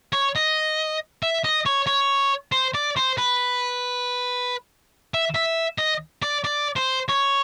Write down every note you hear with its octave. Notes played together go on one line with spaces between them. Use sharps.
C#5
D#5
E5
D#5
C#5
C#5
C5
D5
C5
B4
E5
E5
D#5
D5
D5
C5
C#5